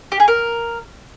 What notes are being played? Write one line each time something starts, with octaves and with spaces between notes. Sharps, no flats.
G4
G#4
A#4